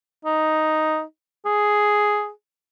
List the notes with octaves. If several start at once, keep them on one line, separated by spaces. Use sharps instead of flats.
D#4
G#4